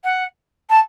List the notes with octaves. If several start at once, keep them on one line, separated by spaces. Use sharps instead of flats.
F#5
A5